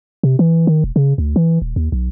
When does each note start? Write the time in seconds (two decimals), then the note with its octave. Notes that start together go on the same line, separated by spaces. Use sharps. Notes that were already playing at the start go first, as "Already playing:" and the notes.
0.23 C3
0.39 E3
0.67 D#3
0.84 E1
0.96 C#3
1.18 D2
1.36 E3
1.62 D#1
1.76 D#2
1.92 B1